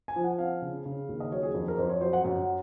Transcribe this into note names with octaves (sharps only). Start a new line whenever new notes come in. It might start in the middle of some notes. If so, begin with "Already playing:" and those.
G#5
F3
F#5
C4 F5
C#3
C#3
D#2
D#5
F#3 C#5
G#4
F2 G#4
A#4
F2 C5
C#5
F#3 C5
F#5
F#2 F#5